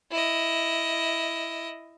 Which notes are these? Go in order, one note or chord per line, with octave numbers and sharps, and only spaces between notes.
E4 D#5